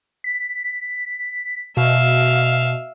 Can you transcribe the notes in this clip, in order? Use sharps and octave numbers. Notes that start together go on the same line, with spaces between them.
B6
B2 E5 F5